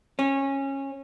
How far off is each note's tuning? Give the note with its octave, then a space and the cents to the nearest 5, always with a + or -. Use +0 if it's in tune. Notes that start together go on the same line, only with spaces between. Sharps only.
C#4 -20